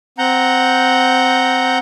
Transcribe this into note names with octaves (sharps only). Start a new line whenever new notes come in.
C4 F#5 A#5 G6